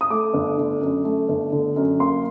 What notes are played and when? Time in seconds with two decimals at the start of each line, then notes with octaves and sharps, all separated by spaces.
0.01 D#6
0.10 A3 D6
0.34 G1
0.58 D3
0.81 F#2
1.05 A3
1.29 G1
1.52 D3
1.76 F#2
2.00 A#3 C6